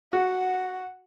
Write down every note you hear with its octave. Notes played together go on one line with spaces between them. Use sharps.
F#4 F#5